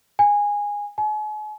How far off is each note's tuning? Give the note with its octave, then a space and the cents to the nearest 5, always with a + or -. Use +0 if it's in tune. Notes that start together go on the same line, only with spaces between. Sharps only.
G#5 -15
G#5 +40